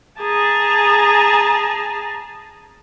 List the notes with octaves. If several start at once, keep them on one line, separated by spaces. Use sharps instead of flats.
G#4 A5 A#5